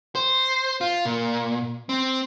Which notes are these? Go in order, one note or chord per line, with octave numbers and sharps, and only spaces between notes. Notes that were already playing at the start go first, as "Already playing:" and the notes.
C5
F4
A#2
C4